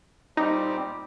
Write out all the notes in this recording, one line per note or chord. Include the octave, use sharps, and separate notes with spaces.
A#2 G3 C4 D#4 G4